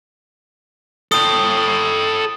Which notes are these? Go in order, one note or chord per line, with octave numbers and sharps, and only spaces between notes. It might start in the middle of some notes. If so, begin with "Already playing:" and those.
A4 G5 D#6